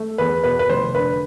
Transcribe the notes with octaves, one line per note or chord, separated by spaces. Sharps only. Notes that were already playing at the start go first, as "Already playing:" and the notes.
Already playing: A3
E2 B4
B2 B4
B4
F1 C5
D3 B4